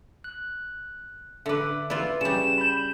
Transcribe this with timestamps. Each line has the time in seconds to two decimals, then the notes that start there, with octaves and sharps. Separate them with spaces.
0.24 F#6
1.46 D3 B4 E5 D6
1.90 E4 F4 B4 D5
2.21 C#3 G3 E7
2.58 B5 G6